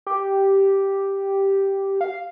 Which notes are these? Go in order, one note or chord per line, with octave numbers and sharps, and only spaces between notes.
G4
F5